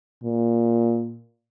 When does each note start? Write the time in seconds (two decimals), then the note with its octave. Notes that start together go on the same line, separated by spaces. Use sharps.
0.24 A#2